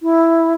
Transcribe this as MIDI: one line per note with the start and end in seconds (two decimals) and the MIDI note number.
0.02 0.53 64